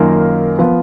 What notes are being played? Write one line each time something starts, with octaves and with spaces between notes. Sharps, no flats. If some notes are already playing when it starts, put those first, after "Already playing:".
Already playing: F#2 D#3 A#3 F4 A#4
F3 B3 F4 B4